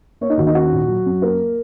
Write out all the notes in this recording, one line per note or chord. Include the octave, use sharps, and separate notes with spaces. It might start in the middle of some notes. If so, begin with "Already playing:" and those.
A#3 C#5
D#4
D#2 F#4
D#4
C#4 F#4
A#2
F#3
F#2
A#3 A#4